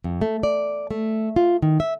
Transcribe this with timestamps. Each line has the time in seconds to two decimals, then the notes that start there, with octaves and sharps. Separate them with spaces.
0.04 F2
0.21 A3
0.43 D5
0.91 A3
1.36 F4
1.62 D#3
1.80 E5